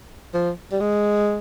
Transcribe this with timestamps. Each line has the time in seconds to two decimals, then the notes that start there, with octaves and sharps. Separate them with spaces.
0.34 F3
0.72 G3
0.80 G#3